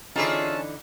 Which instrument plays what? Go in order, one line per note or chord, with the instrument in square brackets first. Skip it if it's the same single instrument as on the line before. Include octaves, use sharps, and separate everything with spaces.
[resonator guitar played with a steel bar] D3 E3 D#4 [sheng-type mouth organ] C#4 A5 [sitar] F4 G#4 E5